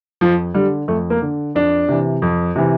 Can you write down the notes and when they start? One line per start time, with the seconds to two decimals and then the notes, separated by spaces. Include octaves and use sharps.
0.21 F2 F3
0.54 D3 G3
0.88 F2 A3
1.10 A#3
1.22 D3
1.55 F2 D4
1.88 C3 E3
2.22 F2
2.56 C3 E3